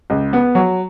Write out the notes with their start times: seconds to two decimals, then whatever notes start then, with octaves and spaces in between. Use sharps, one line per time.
0.10 C#2
0.33 B3
0.55 F#3